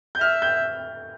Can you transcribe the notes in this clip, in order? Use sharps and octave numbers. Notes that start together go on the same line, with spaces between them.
G6
E5 F6
G6